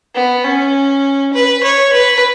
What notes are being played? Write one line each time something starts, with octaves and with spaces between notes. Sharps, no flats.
B3
C#4
B4
C#5
B4